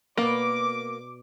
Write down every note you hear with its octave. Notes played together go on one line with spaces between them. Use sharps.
B2 A#3 D5 D6